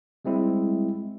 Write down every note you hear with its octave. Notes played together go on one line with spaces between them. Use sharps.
G3 G#3 C4 E4